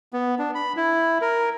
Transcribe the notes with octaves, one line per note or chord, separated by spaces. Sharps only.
B3
D4
B5
E4
A#4